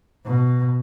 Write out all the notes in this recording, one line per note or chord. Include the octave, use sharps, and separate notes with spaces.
B2